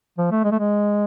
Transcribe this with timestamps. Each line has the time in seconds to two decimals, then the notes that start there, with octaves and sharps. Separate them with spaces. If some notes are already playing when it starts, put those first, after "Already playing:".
0.18 F3
0.31 A3
0.44 G#3
0.52 A3
0.59 G#3